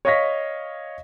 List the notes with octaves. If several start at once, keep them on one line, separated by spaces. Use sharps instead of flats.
C#5 D#5 F5 C#6 A#6 B6